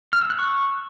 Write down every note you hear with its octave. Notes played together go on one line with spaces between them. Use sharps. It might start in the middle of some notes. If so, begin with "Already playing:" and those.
F6
E6
F#6
C#6